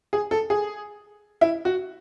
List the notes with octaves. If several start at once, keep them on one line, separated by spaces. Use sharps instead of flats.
G#4
A4
G#4
E4
F#4